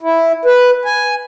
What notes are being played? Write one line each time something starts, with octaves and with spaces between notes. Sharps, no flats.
E4
B4
G#5